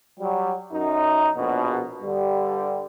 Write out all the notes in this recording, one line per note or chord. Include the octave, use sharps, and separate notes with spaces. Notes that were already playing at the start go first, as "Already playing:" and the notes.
F#3 G3
F#2 D#4
A#1 B2
G2 D3 G3